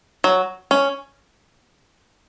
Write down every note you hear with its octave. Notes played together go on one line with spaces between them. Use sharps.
F#3
C#4